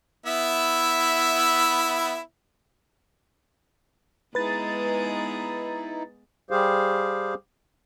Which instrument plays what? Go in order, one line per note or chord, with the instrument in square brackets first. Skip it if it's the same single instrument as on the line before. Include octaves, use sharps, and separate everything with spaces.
[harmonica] B3 E4 E5
[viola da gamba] G#3 B3 G#4 [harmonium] D#4 E4 [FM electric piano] B4 A6
[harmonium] G3 G4 G#4 C5 F5